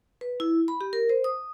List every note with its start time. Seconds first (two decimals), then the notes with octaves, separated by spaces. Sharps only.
0.21 B4
0.40 E4
0.68 B5
0.81 G4
0.93 A#4
1.09 C5
1.24 D#6